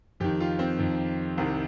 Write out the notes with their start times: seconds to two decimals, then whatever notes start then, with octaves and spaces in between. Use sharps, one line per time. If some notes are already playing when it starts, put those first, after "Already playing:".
0.20 F2 D#3 G4
0.40 F4
0.59 C4
0.79 F2 D#3
1.37 C2 C3 D#3